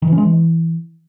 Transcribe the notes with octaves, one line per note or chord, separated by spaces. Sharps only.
D#3
E3
C#4
G#3
E3